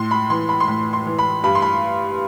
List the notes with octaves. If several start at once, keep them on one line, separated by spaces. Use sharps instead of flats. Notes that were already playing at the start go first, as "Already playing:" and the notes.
Already playing: A2 C6
B5
E3 C6
B5
C6
A2 B5
C6
E3
B5
G2 B5
C6
B5